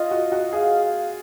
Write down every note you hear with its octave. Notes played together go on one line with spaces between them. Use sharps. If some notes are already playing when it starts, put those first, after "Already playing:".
Already playing: F4 D#5
F#4
F#4
G#4 F5